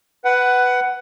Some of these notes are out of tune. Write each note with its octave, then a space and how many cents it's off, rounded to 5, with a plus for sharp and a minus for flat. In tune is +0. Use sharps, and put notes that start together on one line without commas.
B4 +5 F#5 +15